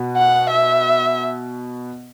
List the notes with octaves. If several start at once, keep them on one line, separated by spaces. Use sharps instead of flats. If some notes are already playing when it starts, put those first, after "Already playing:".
Already playing: B2 F#4
F#5
E5